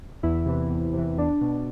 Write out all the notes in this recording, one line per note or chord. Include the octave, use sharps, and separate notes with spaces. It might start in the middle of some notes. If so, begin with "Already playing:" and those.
E2 E4
C3 E3
E2
C3 E3
E2 D4
B2